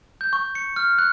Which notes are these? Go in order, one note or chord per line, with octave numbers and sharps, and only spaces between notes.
G6
C#6
C#7
F6
F#6